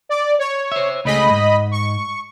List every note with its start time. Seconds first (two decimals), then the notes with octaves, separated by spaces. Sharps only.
0.09 D5
0.39 C#5
0.72 C5 E5
1.05 C#2 A3 G#4 D#5 B5
1.30 G#2
1.71 C#6